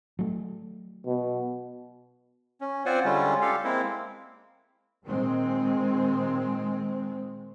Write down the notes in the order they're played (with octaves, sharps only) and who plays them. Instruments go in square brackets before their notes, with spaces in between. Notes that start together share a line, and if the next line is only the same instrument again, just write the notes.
[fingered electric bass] F#3 A3
[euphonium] B2
[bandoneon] C#4
C4 F4 C5 D5 F#5 G#5
D3 G3 G#3 C#4 F4
G4 A4 F5
G#3 A#3 C4 E4
[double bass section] A#2 D#3 G#3 C4